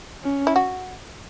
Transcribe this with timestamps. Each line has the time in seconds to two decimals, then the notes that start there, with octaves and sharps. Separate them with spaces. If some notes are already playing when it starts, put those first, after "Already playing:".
0.23 C#4
0.47 E4
0.56 F#4